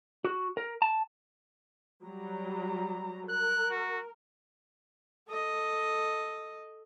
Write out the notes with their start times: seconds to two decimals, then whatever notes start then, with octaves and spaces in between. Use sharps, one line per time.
0.24 F#4
0.57 A#4
0.82 A5
2.04 F#3 G3 A#5
3.30 A#4 F#6
3.70 F#4
5.28 A4 D#5